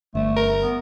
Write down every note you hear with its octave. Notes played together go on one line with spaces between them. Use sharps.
G1 A3
A#4
B3